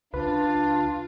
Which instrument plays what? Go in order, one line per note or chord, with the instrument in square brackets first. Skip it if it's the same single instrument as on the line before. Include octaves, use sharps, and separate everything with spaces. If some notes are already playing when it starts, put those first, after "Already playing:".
[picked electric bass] C#2 [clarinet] D4 [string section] F4 [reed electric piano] B4